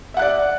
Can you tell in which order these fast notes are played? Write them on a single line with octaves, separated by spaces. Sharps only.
E5 F#5 F#6 D5